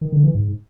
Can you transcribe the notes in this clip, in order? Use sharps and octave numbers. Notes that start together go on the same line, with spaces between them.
D#3
D3
E3
G#2